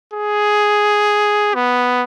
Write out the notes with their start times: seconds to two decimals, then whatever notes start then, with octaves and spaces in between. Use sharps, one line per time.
0.13 G#4
1.55 B3